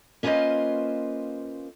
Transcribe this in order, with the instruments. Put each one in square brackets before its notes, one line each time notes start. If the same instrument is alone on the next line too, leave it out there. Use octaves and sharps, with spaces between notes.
[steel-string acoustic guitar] A#3 C#4 F4 B4 C5 D#5